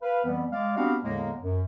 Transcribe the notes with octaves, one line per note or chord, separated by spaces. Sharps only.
B4 F5
F2 E3 G3 B3
G#3 D5 F5
B3 C4 D4 F#4 G4 F5
E2 A2 D3 G#3 A#3
F#2